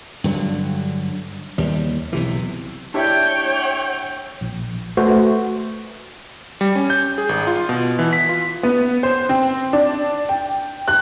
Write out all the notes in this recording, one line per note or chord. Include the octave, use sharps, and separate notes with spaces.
G2 D3 F#3
D#2 G3
B1 C3 E3
D4 E4 G4 C#5 G5
A#1
A3 F#4 A4 B4 C5
G3
C#4
G6
G#4
G#1
F4
B2
E3
B6
F4
B3
C5
C4
D4
G5
F#6